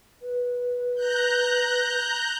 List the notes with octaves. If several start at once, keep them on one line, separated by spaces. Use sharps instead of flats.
B4
A#5 F#6 G6